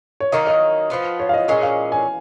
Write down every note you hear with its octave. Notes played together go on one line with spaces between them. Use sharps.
C#5
D#3 F#3 A#3 D#4 D#5
D#5
F3 B3 F4
C#5
F5
D#5
A#2 G#3 C#4 C#5
F5
G#5